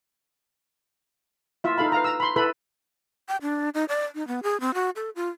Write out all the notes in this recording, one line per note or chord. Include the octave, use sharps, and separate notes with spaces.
E4 F4 E5
D#4 A4 F5 B5
B4 F5 A#5
A#5 E6
B5 C6
E4 A4 B4 B5
G5
D4
D#4
D5
D#4
B3
G#4
C4
F#4
A4
F4